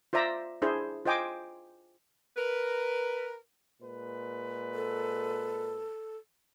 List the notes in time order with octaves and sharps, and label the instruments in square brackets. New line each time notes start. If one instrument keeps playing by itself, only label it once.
[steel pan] F4 C5 D5 E5 A#5
D4 E4 G#4 C5
F4 C5 D#5 G5 G#5 D6
[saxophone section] A#4 B4
[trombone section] A#2 G#3 B4
[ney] A4